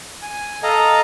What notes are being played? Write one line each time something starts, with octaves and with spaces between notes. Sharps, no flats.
G#5
A4 D#5 F5 A#5